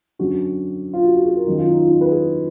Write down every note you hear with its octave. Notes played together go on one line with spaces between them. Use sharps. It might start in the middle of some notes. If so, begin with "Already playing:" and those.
F#2 D3 F#4
F4
F#4
F#4
G#4
A#4
F#2 D#3
F4
D#4
F4
D#4
B4
G#4